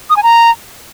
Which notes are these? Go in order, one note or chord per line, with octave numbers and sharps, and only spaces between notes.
D#6
G#5
A#5